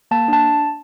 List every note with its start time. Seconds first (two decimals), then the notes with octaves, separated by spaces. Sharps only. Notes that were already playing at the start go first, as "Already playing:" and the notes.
0.11 A#3 A5
0.28 D4 A5